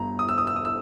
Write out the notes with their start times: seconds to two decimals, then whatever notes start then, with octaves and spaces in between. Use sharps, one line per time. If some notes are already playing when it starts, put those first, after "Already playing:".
Already playing: G1 G2 A#5
0.19 D#6
0.29 E6
0.38 D#6
0.47 E6
0.56 D#6
0.65 E6